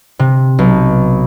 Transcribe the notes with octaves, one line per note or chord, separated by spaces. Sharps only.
C3
B1